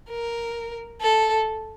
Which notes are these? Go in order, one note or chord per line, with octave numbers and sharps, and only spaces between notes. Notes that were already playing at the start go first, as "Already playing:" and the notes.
A#4
A4